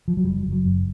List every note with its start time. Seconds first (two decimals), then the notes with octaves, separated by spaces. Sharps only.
0.08 F3
0.17 F#3
0.24 F#1 G3
0.46 F#1
0.52 F#3
0.65 F#2